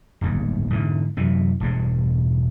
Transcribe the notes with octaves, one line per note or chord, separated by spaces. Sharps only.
D1 G1 D#2 G#2
G#2 D3 E3
F#2 C3 E3
E1 G2 G#3